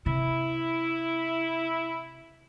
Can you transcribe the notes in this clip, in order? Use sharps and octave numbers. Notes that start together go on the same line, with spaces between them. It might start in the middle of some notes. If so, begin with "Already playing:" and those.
C3 E4